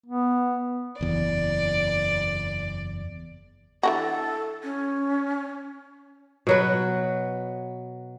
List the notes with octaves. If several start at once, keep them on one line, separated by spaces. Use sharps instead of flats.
B3
F#1 E2 D5
E3 D4 F#4 A4
C#4
B2 F#3 B4